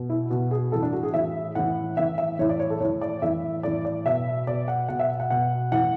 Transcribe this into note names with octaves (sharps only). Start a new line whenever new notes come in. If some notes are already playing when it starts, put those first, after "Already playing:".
Already playing: B2
E4
B2 F#4
G#4
A2 E3 A4
D4
F#4
G#4
A2 E3 E5
A2 E3 F#5
A2 E3 E5
E5
A2 E3 C#5
D5
C#5
A4
A2 E3 C#5
D5
A2 E3 E5
A2 E3 D5
D5
B2 E5
B2 D5
F#5
B2 F#5
E5
F#5
B2 F#5
A2 E3 F#5